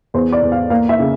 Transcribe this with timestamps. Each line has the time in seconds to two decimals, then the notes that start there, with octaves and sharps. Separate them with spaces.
0.14 E2 C5
0.33 D5
0.42 E2
0.52 F5
0.70 A#3 F5
0.89 E5
0.99 C#3